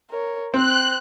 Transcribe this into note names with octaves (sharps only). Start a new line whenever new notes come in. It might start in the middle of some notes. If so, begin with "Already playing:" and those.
A#4 C#5
C4 C5 G5 F#6